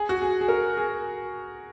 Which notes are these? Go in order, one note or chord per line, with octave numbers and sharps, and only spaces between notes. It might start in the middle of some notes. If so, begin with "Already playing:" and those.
Already playing: G#4
F#4
G#4
G#4
A#4
G#4